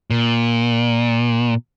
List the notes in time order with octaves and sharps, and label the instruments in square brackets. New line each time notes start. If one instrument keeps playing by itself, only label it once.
[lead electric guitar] A#2